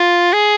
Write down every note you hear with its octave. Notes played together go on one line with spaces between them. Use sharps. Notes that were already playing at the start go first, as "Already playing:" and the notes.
Already playing: F4
G#4